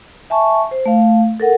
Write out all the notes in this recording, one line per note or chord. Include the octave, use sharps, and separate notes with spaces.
E5 G#5 A5 C#6
C5
A3 F5
A4 A#4 F#5